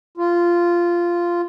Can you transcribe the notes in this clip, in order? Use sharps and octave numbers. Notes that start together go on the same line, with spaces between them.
F4